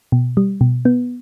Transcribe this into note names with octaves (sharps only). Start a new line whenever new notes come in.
B2
G3
B2
B3